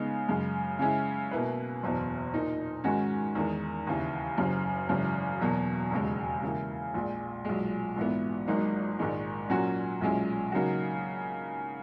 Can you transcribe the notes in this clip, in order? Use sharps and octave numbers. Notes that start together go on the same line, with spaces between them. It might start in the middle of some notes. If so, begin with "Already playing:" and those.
Already playing: C#3 G#3 B3 D#4
F#2 C#3 G#3
C#3 G#3 C#4 E4
B2 A#3 E4 B4
F#1 E2 B2
A#2 A#3 D#4
G#2 D#3 G#3 C#4 F#4
E2 D#3 G#3
D#2 C#3 E3
F#1 F#2 C#3
G#1 F#2 C#3 E3
E2 B2 F#3 A#3
E1 D#2 C#3 G#3
C#3 E3 A#3
A#1 A#2 G#3
B1 A#2 G#3
A#1 G#2 E3 B3
G#1 G#2 F#3 A#3 D#4
A#1 G#2 D#3 G#3
A#2 F#3 A#3 C#4 F#4
B1 A#2 G#3 C#4 E4
C#3 F#3 A#3 D#4 F#4